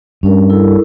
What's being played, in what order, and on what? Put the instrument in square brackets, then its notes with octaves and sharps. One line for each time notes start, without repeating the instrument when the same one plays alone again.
[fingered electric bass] G2 [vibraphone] C#4 A#4
[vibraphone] E4 A4 A#4